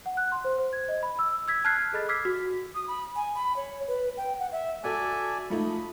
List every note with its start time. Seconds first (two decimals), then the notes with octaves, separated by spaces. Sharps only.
0.06 F#5
0.17 F#6
0.32 C6
0.44 C5
0.59 C5
0.73 G#6
0.88 D#5
1.03 B5
1.19 E6
1.48 E6 G#6 B6
1.65 A5 F6 F#6 G#6 C7
1.93 G#4 A4 D#5 B5 A6
2.09 D6 E6 F6 G#6 B6 C7
2.25 F#4
2.75 D#6
2.88 B5
3.16 G#5
3.35 B5
3.56 C#5
3.88 B4
4.17 G5
4.39 F#5
4.52 E5
4.84 F#4 A4 D5 E5 G#5
5.50 F3 A3 D#4 B5